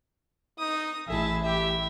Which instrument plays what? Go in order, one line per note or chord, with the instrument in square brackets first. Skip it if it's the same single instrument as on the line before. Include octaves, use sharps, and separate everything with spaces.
[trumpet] D#4 [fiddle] D#6
[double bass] A1 E4 [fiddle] G#4 A5 [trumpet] E5
[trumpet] G4 [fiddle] E5